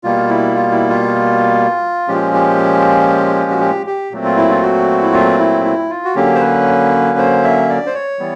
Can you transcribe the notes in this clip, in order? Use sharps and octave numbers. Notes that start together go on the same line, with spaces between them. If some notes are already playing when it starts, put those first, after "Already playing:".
B2 G3 A#3 F4
E4
F4
E4
F4
A#2 F3 G#3 C#4 G4
G4
F#4
G4
G4
A#2 F#3 A3 C4
F4
E4
F4
F#4
E4
F4
E4
E4
F4
F#4
D3 F#3 A#3 C#4 G4
C5
B4
C5
E5
D5
C5
C#5
E3 G3 B3